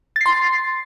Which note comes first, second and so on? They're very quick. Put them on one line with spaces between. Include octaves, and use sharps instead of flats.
A6 C7 C6